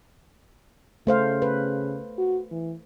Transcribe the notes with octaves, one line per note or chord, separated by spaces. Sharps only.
C#3 A3 C5 F5
B4
F#4
E3